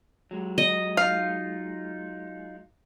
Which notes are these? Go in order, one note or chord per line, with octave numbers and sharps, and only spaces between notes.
F#3 G#3
D#5
D#4 F4 F5